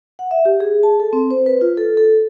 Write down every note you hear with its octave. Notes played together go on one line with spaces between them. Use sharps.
F#5
E5
G4
G#4
A5
A4
C4
C5
B4
F4
A4
A4